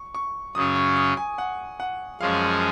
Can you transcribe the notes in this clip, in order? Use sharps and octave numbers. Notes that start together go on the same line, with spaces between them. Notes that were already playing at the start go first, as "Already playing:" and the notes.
Already playing: C#6
C#6
F#2 C#3 F#3 C#4 D#6
C#6
D#6
G#5
F#5
F#5
F#2 F3 G#3 C#4 G#4 F5